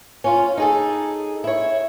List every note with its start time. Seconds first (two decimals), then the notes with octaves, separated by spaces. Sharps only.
0.24 C#4 F4
0.57 D#4 G#4 A4
1.44 E4 C#5